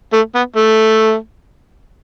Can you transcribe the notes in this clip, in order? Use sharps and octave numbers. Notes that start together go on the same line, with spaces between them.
A3
B3
A3